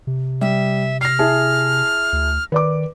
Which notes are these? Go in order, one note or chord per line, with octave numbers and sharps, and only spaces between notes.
C3
G3 E5
F6 A#6 C7
E4 G#4 A5
D2
D#3 B4 D5 D6